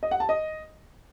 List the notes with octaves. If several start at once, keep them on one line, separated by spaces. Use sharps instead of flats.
D#5
F#5
A5
D#5